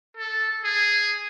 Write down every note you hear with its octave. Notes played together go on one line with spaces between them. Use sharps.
A4
G#4